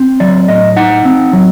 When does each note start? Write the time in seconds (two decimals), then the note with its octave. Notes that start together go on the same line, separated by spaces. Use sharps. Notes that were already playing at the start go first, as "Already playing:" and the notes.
Already playing: C4
0.20 F#3 D5
0.48 A2 D#5
0.77 D#4 F#5
1.05 C4
1.33 F#3